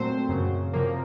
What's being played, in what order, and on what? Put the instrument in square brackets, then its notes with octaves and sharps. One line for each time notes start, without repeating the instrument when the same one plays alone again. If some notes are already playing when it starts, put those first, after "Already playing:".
Already playing: [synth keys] A#2 F#3 A3 C4 C5
F#2 C#3 F#3
C3 F3 A#3